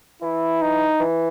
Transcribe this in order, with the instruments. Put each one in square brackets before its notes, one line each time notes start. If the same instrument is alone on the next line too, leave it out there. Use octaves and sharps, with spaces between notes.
[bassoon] E3 [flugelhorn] E4
[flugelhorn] D#4
[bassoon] E3